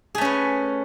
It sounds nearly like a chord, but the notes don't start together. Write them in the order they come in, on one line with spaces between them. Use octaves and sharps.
G#4 A3 C#4 B4